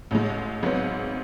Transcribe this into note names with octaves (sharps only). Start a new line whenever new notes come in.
A1 A2 G#3
G#1 G#2 F#3 B3